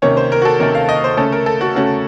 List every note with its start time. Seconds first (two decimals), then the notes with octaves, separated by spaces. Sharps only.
0.02 C3 D#3 A#3 C#4 C#5
0.17 C5
0.32 A#4
0.42 F#4
0.45 A4
0.60 C3 D#3 A#3 C#4 A#4
0.75 F5
0.89 D#5
1.04 C5
1.17 C#3 A3 C#4 A4
1.32 A#4
1.46 A4
1.61 F#4
1.75 C#3 A3 C#4 F#4